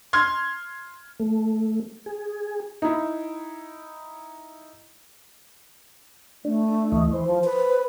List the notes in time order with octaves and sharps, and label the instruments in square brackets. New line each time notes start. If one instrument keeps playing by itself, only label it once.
[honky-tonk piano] C6 F6 G#6
[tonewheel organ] A3
G#4
[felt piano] D#4 E4
[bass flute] A3 [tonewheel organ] D4
[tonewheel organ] D2 E3 D#5
[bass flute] E3 [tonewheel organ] C5
[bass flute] F3
B4